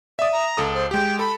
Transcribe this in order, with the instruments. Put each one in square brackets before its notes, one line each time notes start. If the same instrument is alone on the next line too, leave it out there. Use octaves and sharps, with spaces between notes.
[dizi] D5 [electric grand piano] E5 D#6
[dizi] A#5
[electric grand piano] C#2 A4 D#6
[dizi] C5
[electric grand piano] G#3 G4 [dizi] G5
[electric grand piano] A4 [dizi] B5